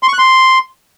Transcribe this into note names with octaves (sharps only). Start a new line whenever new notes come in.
C6
C#6
F#6
C6